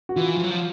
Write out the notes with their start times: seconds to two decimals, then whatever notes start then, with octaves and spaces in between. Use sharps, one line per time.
0.09 F#4
0.16 E3 F4
0.36 F3
0.43 F#3
0.51 F3